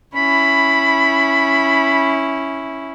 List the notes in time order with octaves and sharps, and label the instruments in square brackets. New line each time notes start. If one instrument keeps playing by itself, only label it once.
[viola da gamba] C#4 E4 [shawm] B5